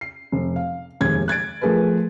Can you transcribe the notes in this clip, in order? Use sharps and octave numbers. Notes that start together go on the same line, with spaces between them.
C7
F1
F5
F1 D#2 G#3 G#6
F#6 G#6 A6 D7
F3 A3 G#4 A#4 B4